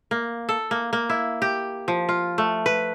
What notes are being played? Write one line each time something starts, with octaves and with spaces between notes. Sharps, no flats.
A#3
A4
A#3
A#3
E4
G4
F3
F4
A3
B4